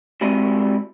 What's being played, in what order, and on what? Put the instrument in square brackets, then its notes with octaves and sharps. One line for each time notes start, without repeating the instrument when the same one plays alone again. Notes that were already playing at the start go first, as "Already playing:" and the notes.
[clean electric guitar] G3 G#3 C4 E4 F#4 D#5